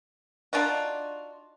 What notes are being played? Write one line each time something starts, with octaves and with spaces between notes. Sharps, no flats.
D4 D#4 F4 F#4